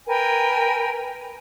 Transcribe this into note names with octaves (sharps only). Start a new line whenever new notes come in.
A#4 B4 G5 G#5